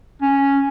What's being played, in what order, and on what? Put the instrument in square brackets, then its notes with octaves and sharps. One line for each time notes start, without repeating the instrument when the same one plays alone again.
[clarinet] C#4